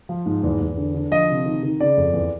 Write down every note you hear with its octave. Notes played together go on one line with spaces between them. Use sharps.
F3
G#2
E2
E2
D3
D3
F3 D#5
C3
D#3
D#3
C#3 D5
F2
E2